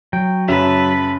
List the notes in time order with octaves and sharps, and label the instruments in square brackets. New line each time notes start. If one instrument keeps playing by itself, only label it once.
[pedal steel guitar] F#3 [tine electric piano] G5
[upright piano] F#2 C#3 [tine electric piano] F#3 [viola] B4 [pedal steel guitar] E5 A5